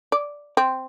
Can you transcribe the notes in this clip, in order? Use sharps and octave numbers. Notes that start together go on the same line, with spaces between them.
D5
C4